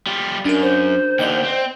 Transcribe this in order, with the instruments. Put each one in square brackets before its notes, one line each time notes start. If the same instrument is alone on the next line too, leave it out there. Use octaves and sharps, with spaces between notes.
[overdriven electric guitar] G3 F4
[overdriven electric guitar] F#2 [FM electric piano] D4 A#4
[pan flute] C5
[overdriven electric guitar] D#2 D3 [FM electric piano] D5 D#5 G5
[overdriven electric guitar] C4